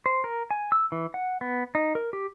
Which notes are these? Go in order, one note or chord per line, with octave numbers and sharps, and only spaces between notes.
C5
A#4
G#5
E6
E3
F#5
B3
D#4
A#4
G4